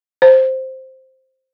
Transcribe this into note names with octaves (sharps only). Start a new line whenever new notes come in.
C5